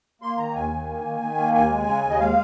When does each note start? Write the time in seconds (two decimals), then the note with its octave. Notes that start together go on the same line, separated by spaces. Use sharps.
0.22 A#3 C6
0.37 D#3 A#5
0.55 D#2 G#5
0.71 D#3
0.88 A#3
1.05 D#3
1.21 D#3
1.38 A#3
1.53 D#2 G#5
1.70 G#3
1.87 C#3
2.03 D#2
2.10 D#5
2.20 G#3 F5